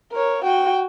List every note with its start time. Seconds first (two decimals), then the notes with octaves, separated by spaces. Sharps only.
0.13 A#4 C#5
0.45 F#4 G5